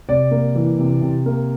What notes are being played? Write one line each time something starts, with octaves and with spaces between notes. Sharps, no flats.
C3 D5
A#3
E3
C3
C3
A#3